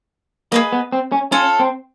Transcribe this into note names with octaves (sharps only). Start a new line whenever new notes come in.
A#3 G#4 B4 D#5
B3
C4
C#4
C#4 F4 A4 C#5
C4